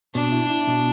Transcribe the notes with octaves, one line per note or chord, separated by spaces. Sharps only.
B2 D4
E4
E4
B2